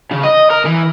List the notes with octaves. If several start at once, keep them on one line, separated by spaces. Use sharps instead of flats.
C#3
D#5
A#4
E3